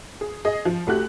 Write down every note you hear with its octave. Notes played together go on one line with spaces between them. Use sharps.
G#4
G#4 D#5
F3
C2 A3 F#4 G4 F#6